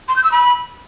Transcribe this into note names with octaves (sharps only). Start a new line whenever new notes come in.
C6
G6
E6
B5